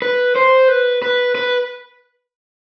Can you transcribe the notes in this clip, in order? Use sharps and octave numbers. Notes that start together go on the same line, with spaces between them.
B4
C5
B4
B4
B4